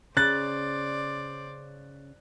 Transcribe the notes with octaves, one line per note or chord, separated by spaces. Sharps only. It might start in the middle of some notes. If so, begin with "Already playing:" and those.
C#3 C5 D5 F#6 A6